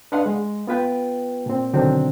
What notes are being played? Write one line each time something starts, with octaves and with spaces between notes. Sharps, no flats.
D4 B4 D#5 F5 F#5 C6
G#3
B3 F4 B4 G5
A#2 C4
B2 D3 D#3 F#3 C4 D4